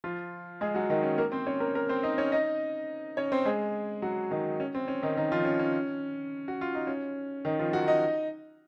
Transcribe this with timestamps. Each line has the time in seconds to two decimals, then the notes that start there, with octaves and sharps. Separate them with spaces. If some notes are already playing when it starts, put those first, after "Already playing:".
0.04 F3 F4
0.61 G#3 G#4
0.75 F#3 F#4
0.90 D#3 D#4
1.03 C#4
1.18 A#3 A#4
1.32 C4 C5
1.46 C#4 C#5
1.60 A#3 A#4
1.75 A#3 A#4
1.89 C4 C5
2.03 D#4 D#5
2.18 C#4 C#5
2.32 D#4 D#5
3.17 C#4 C#5
3.32 C4 C5
3.46 G#3 G#4
4.02 F#3 F#4
4.31 D#3 D#4
4.60 C#4
4.75 C4
4.88 C#4
5.03 D#3 D#4
5.17 D#3 D#4
5.32 F3 F4
5.45 C#4
5.59 C#4
6.48 F#4
6.61 F4
6.75 D#4
6.87 C#4
7.45 D#3 D#4
7.59 F3 F4
7.73 F#3 F#4
7.87 D#4 D#5